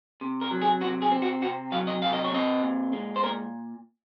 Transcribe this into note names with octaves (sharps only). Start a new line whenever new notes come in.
C3
A#4
F#3
G#4
C3 F#4
G#4
C4
F#4
C3 F#4
F#3 F5
D#5
C3 F5
D#5
C#5
C4 D#5
A#2
G#3
C5
A#2 A#4